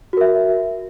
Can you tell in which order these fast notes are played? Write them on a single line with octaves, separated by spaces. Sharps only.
F#4 A#4 E5